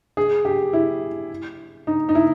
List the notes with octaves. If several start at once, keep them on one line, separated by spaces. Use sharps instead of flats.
G#4
G4
E4
D#4
D#4
E4